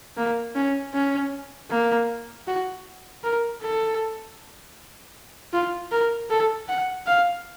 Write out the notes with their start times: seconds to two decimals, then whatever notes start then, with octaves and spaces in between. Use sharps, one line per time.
0.17 A#3
0.55 C#4
0.94 C#4
1.70 A#3
2.47 F#4
3.23 A#4
3.62 A4
5.53 F4
5.91 A#4
6.30 A4
6.68 F#5
7.06 F5